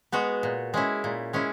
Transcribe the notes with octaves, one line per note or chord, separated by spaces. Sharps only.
G#3 B3 F#4
A#2
G#3 C#4 E4
A#2
G#3 C#4 E4